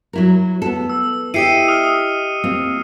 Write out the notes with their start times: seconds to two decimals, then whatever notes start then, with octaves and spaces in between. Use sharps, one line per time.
0.13 F#3 E4 A#4
0.62 B3 A4
0.90 E6
1.34 E4 G4 D#5 C7 C#7 D#7
1.68 D#6 F6
2.44 A#3 C4 F4